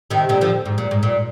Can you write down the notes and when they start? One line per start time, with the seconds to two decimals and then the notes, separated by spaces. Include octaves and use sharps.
0.10 C3 D#3
0.29 A#2 D3
0.41 D3 F3
0.66 G#2
0.78 A#2
0.91 G#2
1.03 A#2